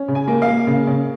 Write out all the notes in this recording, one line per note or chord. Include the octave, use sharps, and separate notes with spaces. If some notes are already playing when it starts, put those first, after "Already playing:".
Already playing: C#4
C#3
G#5
A#3
F5
A#3
C#3
C#3